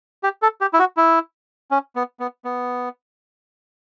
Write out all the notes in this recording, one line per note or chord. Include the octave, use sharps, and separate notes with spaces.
G4
A4
G4
E4
F#4
E4
C#4
B3
B3
B3